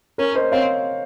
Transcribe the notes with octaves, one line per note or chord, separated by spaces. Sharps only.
C#4 A#4 C#5
C5 D#5
C4 C#5 F5